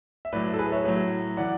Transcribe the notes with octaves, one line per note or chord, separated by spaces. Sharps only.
E5
A2 F#3 B4 D5
A4
G#4 B4
C#5 E5
A2 F#3
E3 D5 F#5